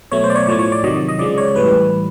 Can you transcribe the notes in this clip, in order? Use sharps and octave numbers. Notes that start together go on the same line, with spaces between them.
B2 F#3 A3 C#5
C5
D5
C#5
A2 F3 A3 C#5
C#5
D5
C3 D#3 F#3 D#5
D#5
C#3 F3 G#3 D5
C#5
A2 E3 G3 B4